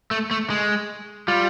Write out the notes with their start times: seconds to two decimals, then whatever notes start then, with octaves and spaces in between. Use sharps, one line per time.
0.11 A3
0.31 A3
0.50 G#3
1.28 G3 F4